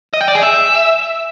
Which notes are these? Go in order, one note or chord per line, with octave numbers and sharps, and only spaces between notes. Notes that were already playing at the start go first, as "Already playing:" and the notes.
D#5
G5
D5
G#4
E5